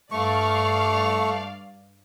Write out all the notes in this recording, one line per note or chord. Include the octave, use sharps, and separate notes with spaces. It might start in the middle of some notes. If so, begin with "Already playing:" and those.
G2 A3 D5 F5 C#6